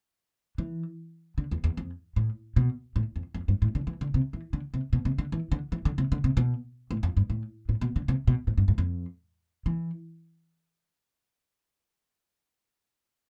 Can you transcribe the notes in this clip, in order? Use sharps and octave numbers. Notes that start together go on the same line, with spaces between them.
E3
D3
E2
E2
F2
A2
B2
A2
F2
F2
G2
A2
D3
E3
D3
C3
E3
D3
C3
B2
C3
D3
E3
D3
E3
D3
C3
D3
C3
B2
A2
F2
G2
A2
A2
B2
D3
C3
B2
A2
G2
G2
F2
E3